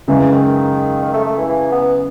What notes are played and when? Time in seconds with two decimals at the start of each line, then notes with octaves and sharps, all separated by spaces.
0.08 F#2 C#3 E3 G#3
0.32 D#3
1.02 D#3
1.13 A3
1.25 A3
1.37 E3
1.48 E3
1.72 B3